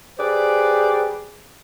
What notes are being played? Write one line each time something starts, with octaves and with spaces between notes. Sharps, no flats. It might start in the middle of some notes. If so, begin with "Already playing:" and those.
G4 G#4 B4 C5 D5